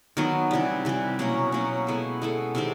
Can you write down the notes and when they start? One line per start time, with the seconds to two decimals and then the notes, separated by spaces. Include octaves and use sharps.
0.17 D#3 F#3 B3
0.51 C3 E3 G3
0.85 C3 E3 G3
1.19 B2 F#3 A#3 C#4
1.52 B2 F#3 A#3 C#4
1.87 G#3 B3 E4 A4
2.22 G#3 B3 E4 A4
2.55 C3 D#3 G#3 C4